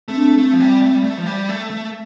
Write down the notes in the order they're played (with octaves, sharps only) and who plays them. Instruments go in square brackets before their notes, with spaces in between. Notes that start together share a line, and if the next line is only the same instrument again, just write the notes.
[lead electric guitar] A3 [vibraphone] C4
[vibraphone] D4
[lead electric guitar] A3 [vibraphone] C4
[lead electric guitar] F3
G3
A3
G3
A3
F3
G3
A3
A3